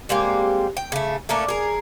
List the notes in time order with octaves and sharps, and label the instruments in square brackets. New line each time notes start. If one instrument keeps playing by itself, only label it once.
[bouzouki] G3 G#3 A#3 C4
G5
C#3 A3
A3 A#3 C#4 D4
G#4 A#4